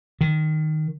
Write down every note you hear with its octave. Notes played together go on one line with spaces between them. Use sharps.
D#3